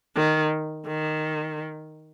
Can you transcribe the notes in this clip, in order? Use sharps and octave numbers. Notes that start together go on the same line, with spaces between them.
D#3
D#3